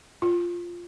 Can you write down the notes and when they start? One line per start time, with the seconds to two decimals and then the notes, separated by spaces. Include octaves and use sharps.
0.22 F4